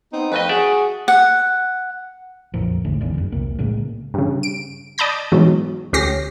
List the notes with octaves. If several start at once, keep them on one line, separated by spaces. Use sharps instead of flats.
B3 C4 D#4
F2 A3 B4 D#5
F#4 G#4 D5 E5
F#5
A#1 F2 A#2 F3
E1 A#1 A2 D3
G#1 E2 D4
F#2 C#3
E1 C2 A#3
A2 C#3 G#3 A#3
G2 C#3
D7
D5 D#5 A5 B5 G6 A#6
G#2 B2 E3 F#3 G#3
D2 C#4 G4 A#6 C7